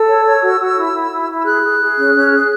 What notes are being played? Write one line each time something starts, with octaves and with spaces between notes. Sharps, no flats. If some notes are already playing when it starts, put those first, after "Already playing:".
Already playing: A4 E6
C#5
C#5
F#4
F#4
E4
E4
E4
E4
E6
G#4 F#6
G#4
G#4
C#4
C#4
G#4